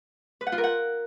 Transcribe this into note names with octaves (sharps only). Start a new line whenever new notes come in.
B4
F#5
F4
A#4
F#5